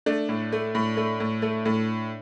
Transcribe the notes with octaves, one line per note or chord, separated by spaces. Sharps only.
A3 D4
A2
A3
A2
A3
A2
A3
A2